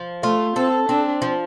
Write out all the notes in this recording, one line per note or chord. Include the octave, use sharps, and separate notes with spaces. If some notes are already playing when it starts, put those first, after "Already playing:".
Already playing: F3
A3 F4
C4 A4
C4 D4
F3